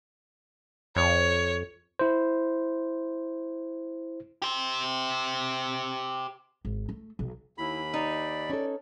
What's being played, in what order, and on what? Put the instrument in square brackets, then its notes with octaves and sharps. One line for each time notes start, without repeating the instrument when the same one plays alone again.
[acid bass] F2 [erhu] C#5
[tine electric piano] E4 C5
[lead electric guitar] G4 C5
[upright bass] G#1
A3
B1 B2
[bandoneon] D#2 B5 [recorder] E4
[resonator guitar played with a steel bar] D#4 [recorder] D5
[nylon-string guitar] C#4 A4